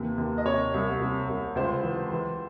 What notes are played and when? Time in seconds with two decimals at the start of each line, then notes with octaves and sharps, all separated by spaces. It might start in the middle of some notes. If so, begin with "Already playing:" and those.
Already playing: D#2 C3 E3
0.18 D#2
0.38 D#5
0.45 C3 C#5
0.74 C2
1.00 C3
1.29 C2
1.56 C#2 C5
1.83 E3
2.12 E3